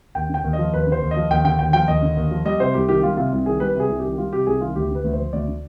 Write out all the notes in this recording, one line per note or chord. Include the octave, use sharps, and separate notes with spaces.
D#2 G5
D3 G5
D#2
D#5
F3
D#2 B4
D3
C5
D#2
D#5
F3
D#2 G5
D3 G5
D#2 G5
F3 G5
D#2 D#5
D3
D#2
F3
G3 D#5
C3 C5
C2 G4
D#3 G4
G3 F4
C3 F4
C2
D#3 G#4
G3 B4
C3
G#4
C2
D#3 G4
G3 F4
C3 G4
C2 G#4
D#3 F4
D2 G4
D3 B4
D2
C5
F3
D2 D5
D3